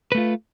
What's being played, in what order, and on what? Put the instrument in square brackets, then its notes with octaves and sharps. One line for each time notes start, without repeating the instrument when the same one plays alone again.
[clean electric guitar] B4
A3
F4